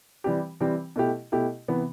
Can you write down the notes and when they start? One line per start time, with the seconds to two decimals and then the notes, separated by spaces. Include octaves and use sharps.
0.24 E3 G3 C4 G4
0.60 E3 G3 C4 G4
0.96 B2 A3 E4 G4
1.32 B2 A3 E4 G4
1.68 C3 E3 B3